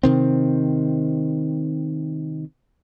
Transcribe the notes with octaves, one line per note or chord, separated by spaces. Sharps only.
C3 D#3 C4